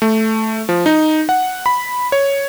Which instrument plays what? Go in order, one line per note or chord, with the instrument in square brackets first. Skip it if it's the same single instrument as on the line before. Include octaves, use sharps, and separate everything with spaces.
[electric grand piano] A3
F3
D#4
F#5
B5
C#5